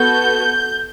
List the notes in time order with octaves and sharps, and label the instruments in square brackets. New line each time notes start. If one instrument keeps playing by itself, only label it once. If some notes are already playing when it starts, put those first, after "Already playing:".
Already playing: [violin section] B3 F#4 A4 G6